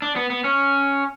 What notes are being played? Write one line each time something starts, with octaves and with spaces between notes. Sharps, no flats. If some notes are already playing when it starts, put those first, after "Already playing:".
D4
B3
B3
C#4